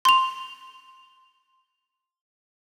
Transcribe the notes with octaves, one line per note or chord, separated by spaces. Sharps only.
C6 F7